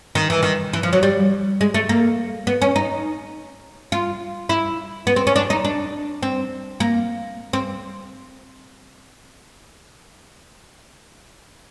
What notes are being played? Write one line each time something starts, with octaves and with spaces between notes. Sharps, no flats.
D#3
E3
D#3
E3
F3
F#3
G3
G#3
A3
A#3
B3
C#4
D#4
F4
E4
B3
C4
C#4
D4
D#4
D4
C4
A#3
C4